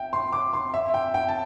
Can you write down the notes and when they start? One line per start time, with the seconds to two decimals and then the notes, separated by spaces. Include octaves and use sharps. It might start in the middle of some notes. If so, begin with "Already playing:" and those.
Already playing: E5 G5
0.13 C6
0.32 D6
0.53 C6
0.74 E5
0.94 G5
1.14 G5
1.28 A5